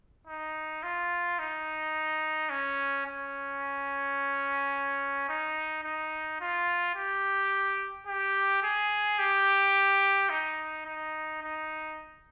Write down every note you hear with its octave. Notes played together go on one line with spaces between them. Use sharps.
D#4
F4
D#4
C#4
C#4
D#4
D#4
F4
G4
G4
G#4
G4
D#4
D#4
D#4